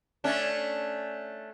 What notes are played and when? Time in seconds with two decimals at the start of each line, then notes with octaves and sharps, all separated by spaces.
0.24 A3 C#4 D4